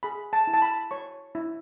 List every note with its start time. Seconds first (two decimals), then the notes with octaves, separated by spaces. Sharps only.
0.03 G#4 B5
0.33 A5
0.47 E4
0.54 A5
0.62 B5
0.91 C#5 C#6
1.35 E4